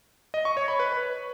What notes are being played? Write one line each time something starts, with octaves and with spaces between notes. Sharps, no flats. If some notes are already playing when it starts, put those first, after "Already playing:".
D#5
C#6
C#5
B5
B4